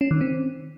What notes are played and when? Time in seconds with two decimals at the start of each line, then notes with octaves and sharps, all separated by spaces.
0.01 C#4
0.11 D#3
0.21 C4